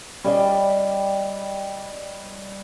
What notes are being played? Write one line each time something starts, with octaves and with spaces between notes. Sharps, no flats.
G3 C#4 D5 D#5 F5